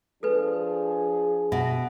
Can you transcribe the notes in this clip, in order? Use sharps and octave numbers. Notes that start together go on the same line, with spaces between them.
F3 D4 G#4 A4 B4
B2 E5